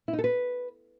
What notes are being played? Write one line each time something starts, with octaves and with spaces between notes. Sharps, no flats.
E4
D#4
A4
B4